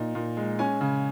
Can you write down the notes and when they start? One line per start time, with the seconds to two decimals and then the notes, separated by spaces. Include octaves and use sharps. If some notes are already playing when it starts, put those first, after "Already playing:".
Already playing: A#2 D#4
0.15 A#2
0.37 G#3
0.59 C#4 G#5
0.81 C#3